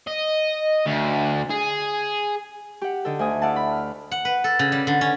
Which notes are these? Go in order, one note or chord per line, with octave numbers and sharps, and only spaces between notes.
D#5
D2
G#4
G4 F#5
D3 D#4 A4
D2 G#5 D#6
E4 D5 F5 F#5 A5
B5
F6
F#5
B4
A4
C#3
G3
D3
C#4